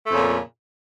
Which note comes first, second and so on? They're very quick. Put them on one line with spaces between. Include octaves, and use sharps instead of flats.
A3 F2 C#3 A#2